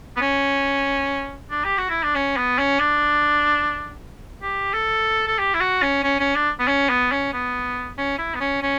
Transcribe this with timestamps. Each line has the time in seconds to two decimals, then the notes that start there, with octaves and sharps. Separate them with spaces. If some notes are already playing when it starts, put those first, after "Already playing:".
0.17 B3
0.21 C#4
1.50 D4
1.64 G4
1.78 F#4
1.90 E4
2.03 D4
2.15 C#4
2.37 B3
2.59 C#4
2.79 D4
4.42 G4
4.74 A4
5.27 A4
5.39 G4
5.54 E4
5.60 F#4
5.82 C#4
6.04 C#4
6.20 C#4
6.36 D4
6.59 B3
6.68 C#4
6.90 B3
7.12 C#4
7.33 B3
7.98 C#4
8.18 E4
8.35 B3
8.40 C#4
8.62 C#4